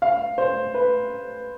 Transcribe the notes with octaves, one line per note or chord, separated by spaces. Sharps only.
F5
C5
B4